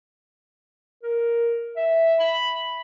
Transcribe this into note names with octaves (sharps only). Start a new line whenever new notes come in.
A#4
E5
B5